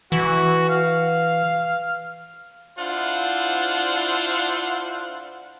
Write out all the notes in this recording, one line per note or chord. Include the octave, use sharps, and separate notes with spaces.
E3 F#4
F5
D4 E4 F4 C5 F#5